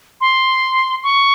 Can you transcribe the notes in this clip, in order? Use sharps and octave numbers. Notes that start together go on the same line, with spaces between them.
C6
C#6